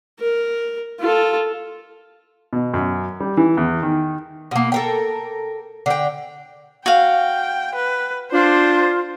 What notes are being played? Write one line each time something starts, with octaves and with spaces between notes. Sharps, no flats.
A#4
F4 A4
B2
F#2
G3
E3
E2
D#3
B2 A#3
A4 A#4 G5
D3 G5
F#4 F5 G5
B4
D4 F4 C5